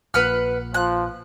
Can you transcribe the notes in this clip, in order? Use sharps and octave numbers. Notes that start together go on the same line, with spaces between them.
A#1 A#2 B4 F#5 F6
F3 F#6